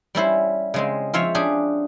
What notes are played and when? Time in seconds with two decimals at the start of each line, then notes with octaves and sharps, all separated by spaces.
0.15 G3 C#4 E4 C5
0.74 C#3 G#3 C4
1.14 F3 C4 F4 C#5 E5 F5
1.35 C#4 D4 G4 G#4